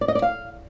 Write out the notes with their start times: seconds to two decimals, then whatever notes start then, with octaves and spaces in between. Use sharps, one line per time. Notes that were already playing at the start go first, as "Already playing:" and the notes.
0.01 D5
0.08 D#5
0.15 D5
0.22 F5